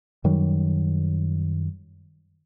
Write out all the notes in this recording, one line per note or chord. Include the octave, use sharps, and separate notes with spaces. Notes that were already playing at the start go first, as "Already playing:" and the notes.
F#2 D#3 F#3 G3